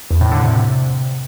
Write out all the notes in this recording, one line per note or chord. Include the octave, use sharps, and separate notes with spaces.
E2
A2
D3
C3